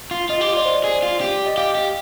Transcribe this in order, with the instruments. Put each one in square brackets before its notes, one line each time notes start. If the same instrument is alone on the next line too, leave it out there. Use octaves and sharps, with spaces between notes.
[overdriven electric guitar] F4
[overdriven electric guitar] F4 [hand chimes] D#5
[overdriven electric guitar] G4
[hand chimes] D#5
[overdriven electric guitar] F4 [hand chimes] D5
[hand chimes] C5
D5
[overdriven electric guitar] G#4
F4
G4
[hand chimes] D#5
[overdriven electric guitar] G4 [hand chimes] F5
[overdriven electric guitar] G4